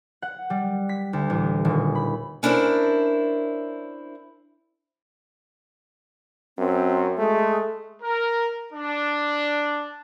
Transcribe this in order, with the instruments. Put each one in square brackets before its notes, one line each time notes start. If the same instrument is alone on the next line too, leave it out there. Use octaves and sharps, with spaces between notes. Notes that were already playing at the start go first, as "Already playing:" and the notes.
[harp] F#5
G3
B6
D2
A1
D#1
B5
[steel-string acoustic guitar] C#4 D4 E4 A#4 C5
[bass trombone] F#2 [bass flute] C4
[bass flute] G#3 [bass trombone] A3
[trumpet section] A#4
D4